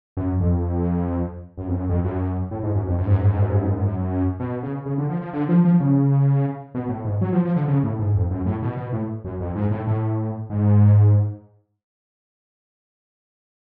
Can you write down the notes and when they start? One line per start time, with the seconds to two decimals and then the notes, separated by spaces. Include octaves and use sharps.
0.17 F#2
0.40 F2
1.58 F#2
1.68 F2
1.74 F#2
1.89 F2
2.04 F#2
2.51 A2
2.63 G#2
2.75 F#2
2.87 F2
2.98 F#2
3.06 G#2
3.13 F#2
3.20 G#2
3.28 F#2
3.34 G#2
3.42 F#2
3.50 G#2
3.57 F#2
3.63 G#2
3.70 F#2
3.78 G#2
3.85 F#2
4.40 B2
4.63 C#3
4.86 C#3
4.98 D3
5.10 F3
5.21 F3
5.33 D3
5.49 F3
5.65 F3
5.80 C#3
6.75 B2
6.89 A2
7.05 G#2
7.21 F#3
7.32 F3
7.45 F3
7.56 D3
7.68 C#3
7.83 A2
7.99 G#2
8.15 F2
8.31 F#2
8.46 A2
8.62 B2
8.77 B2
8.93 A2
9.25 F#2
9.41 F2
9.55 G#2
9.71 A2
9.87 A2
10.50 G#2